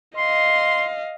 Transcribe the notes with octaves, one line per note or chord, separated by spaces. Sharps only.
D#5 F5 C6